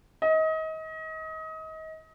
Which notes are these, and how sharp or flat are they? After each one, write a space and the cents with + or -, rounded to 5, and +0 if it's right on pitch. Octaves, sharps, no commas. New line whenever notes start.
D#5 +30